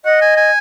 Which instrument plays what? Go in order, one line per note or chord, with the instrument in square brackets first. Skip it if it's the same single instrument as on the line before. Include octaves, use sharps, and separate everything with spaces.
[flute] D#5 [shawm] F#5
[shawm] G#5
G#5